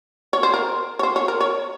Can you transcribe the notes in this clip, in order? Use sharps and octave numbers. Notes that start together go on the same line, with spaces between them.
C#5
C5
A#4
C#5
C5
C#5
A#4
C#5